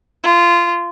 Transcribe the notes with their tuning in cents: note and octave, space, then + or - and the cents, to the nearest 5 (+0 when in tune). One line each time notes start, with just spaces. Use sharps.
F4 -20